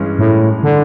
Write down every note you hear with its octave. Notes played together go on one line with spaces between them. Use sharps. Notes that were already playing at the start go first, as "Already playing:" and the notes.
Already playing: G2 E3 G#3 C#4
A2
D3